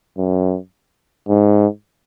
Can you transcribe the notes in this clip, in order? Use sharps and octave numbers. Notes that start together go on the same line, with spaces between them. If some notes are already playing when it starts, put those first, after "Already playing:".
F#2
G#2